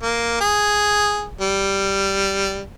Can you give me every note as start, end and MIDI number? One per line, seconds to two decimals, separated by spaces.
0.02 0.37 58
0.41 1.28 68
1.41 2.61 55